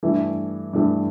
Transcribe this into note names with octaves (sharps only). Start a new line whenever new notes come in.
G2 E3 A3 E4
G2 E3 A3 E4